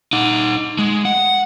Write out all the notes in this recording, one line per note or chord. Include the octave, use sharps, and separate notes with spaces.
D#4 F#5
G#3
F#5